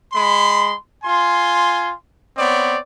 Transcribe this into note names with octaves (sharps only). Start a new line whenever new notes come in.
G#3 B5 C6
F4 G#5 C6
B3 C4 C#5 D5